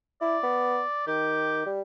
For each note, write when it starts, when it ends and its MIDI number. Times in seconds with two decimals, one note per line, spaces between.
0.21 0.38 64
0.21 1.04 74
0.44 0.82 59
1.07 1.63 51
1.07 1.69 67
1.66 1.82 55